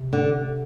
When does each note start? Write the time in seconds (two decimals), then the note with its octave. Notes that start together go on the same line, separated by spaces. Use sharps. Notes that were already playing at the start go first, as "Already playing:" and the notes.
Already playing: C3
0.13 D3